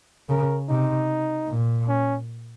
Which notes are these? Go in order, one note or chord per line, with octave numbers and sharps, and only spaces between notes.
C#3 A#4
C3 D#4
A#2
C#4